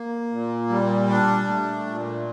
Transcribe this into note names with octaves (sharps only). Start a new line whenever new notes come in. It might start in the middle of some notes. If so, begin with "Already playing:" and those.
Already playing: A#3
A#2
G3
D4
A3
A#2